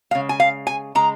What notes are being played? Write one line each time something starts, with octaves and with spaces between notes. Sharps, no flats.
C#3 G#3 F5
G#5
F5
G#5
C#3 G#3 A#5